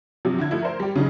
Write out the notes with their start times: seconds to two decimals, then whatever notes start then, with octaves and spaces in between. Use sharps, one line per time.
0.25 C3 F3 F#3
0.38 D3 E4 G#6
0.51 F3 A3 E4
0.62 A#4 C5
0.80 G3 G4
0.96 C#3 F#3 D#4